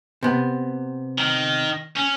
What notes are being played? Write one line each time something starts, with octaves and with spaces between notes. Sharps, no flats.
C3 B3
D#3
C#4